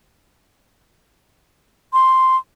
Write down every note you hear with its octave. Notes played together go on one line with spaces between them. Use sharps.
C6